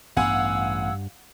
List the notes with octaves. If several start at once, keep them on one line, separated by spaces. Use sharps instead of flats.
A1 G2 B3 F5 F#5 G#5 E6